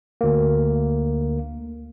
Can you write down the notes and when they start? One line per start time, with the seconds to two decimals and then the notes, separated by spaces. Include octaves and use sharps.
0.21 D2 A#3